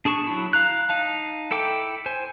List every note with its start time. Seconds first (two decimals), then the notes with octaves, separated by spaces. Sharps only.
0.05 D4 G#4 A5 C#6
0.27 F#3 E4
0.53 F5 A#5 F#6
0.89 D#4 F5 A5
1.51 E4 A4 G5 D6
2.06 C5 G#5